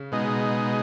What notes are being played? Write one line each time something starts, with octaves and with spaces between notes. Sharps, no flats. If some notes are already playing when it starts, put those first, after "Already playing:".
Already playing: C#3
B2 G#3 D#4